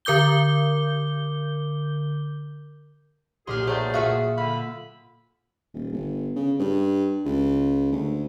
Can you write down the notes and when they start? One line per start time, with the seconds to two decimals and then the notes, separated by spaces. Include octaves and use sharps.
0.05 D3 A#4 D6 G6 G7
3.47 B1 A#2 G4 G#4 C6 F6
3.67 F#3 A3 G#4 B4 C5 D5
3.94 A#2 A3 F4 F#4 E5 F5 D#6
4.38 D3 F5 B5
5.74 D#1
5.92 G1
6.36 C#3
6.59 G2
7.25 C#2
7.92 D2